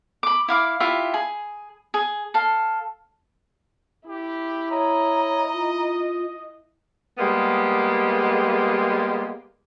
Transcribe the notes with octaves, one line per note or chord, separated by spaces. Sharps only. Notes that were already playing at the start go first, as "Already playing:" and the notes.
B5 D6
E4 F5 D6
E4 F4 G4 E5
G#4
G#4
A4 F5
E4 G4
C#5 D#5 A#5
F4
G3 G#3 A#3 B3 G4